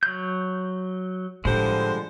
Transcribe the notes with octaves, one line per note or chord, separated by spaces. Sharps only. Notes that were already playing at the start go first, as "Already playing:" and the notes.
F#3 G6
A2 D3 F3 G3 G#3 C5